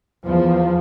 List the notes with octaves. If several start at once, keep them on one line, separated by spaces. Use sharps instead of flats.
E2 F3